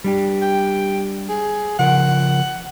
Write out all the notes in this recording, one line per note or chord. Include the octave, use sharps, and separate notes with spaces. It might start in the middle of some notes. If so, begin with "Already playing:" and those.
G3 D4 G4
G5
G#4
C#3 F3 A#4 F#5